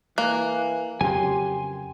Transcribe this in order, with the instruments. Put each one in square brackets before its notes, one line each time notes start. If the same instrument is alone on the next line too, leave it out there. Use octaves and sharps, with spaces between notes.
[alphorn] E3 [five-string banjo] A#3 [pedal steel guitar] F#6
[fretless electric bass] F2 C#3 F#3 [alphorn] G4 [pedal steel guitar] G#5 C6